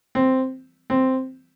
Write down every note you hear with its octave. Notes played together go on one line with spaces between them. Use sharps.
C4
C4